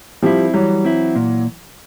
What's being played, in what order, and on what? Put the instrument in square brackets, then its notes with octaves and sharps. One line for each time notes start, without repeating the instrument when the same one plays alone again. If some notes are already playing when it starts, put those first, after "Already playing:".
[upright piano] F3 G3 [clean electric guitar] C4 E4
[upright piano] E3 F#3 [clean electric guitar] G3
[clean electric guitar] C4 E4
A#2